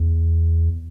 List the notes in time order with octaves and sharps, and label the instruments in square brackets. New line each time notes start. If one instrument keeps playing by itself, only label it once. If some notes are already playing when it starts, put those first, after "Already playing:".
Already playing: [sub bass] E2